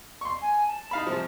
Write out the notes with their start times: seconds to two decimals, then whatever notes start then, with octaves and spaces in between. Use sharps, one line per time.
0.21 C6 C#6
0.41 G#5
0.67 A5
0.91 D#4 F5 B5
1.07 G#2 C3 F3